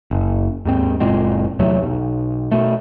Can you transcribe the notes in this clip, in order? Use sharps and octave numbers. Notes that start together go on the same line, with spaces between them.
F#1
D#2 G#2 C4
F#1 A#2 G#3 C4
E2 C3 F#3 A3
B1
B2 A3